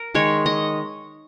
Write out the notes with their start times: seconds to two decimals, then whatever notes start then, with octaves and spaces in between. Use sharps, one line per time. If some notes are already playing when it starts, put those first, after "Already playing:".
Already playing: A#4
0.15 D#3 G#3 C#5
0.46 D#5